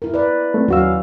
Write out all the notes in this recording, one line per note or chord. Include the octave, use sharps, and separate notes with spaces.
E4 A#4
B4 D5
A3 C4
D#2 F#3 C#4 F#4 F5 E6